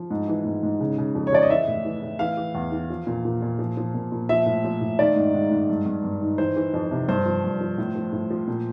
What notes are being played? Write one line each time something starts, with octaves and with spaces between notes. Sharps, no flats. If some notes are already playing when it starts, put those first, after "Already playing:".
Already playing: F3
G#2
E3
G#2
G#2
C#3
C#3
F2
C#5
F2 D5
D#5
E3 E5
A2
E3
A2
E3 F5
E3
E2
E3
F3
A#2
A#2
A#2
F3
F3
A#2
A#2
F3 E5
A2
F3
A2
D#3 D5
G#2
G#2
G#2
G2
G2
G2
D#3
E3 C5
E3
F2
C3
G2 C5
F3
G2
F3
A2
F3
A2
F3
A#2